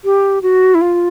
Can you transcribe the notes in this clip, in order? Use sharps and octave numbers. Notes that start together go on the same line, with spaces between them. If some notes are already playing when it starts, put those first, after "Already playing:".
G4
F#4
E4
F4